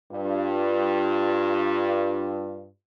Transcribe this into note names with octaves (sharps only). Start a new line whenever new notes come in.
G2 F4